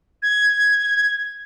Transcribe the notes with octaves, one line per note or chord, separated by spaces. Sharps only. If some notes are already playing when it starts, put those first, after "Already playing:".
G#6